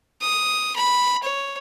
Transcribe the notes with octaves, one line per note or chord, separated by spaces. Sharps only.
D#6
B5
C#5